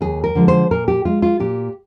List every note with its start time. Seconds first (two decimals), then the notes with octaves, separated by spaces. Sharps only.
0.01 D#2 G#4
0.24 A#4
0.35 D3 F3 G#3
0.48 C5
0.71 A#2 A#4
0.88 G4
1.05 G#3 F4
1.22 F4
1.40 A#2 G4